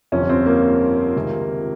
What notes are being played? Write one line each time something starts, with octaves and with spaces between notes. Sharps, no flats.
G1 F2 C3 C#4
C4
A#3
C#2 C3 D#3